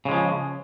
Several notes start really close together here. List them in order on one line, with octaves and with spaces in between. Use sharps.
C#3 G#3 F3